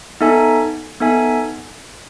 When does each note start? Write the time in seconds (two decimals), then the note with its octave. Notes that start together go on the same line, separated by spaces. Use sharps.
0.21 B3 D#4 A4 E5 G#5
1.00 B3 D#4 A4 E5 G#5